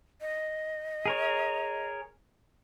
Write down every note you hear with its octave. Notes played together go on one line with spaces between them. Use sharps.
D#5
G#4 A#4 C#5